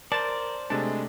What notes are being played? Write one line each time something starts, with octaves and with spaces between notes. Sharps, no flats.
A#4 C5 D5 A5
C3 G#3 A3 D4 A5